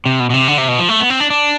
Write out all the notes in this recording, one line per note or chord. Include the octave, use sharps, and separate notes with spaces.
C3
B2
B2
C3
D3
C3
B2
F3
A3
B3
C4
D4
D4